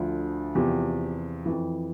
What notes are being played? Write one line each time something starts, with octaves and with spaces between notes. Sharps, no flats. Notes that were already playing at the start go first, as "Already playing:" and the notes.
Already playing: D2 D3 F3
E2 C3 F3 G4
F2 E3